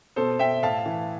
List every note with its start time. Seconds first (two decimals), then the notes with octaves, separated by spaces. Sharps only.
0.16 B2 A4 C5
0.39 B2 E5 G5
0.63 A2 F5 A5
0.86 E3